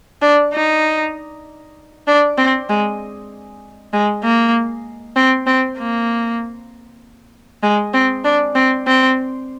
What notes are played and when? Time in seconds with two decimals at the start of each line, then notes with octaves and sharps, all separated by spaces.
0.22 D4
0.54 D#4
2.07 D4
2.38 C4
2.69 G#3
3.93 G#3
4.24 A#3
5.16 C4
5.47 C4
5.78 A#3
7.63 G#3
7.94 C4
8.24 D4
8.55 C4
8.87 C4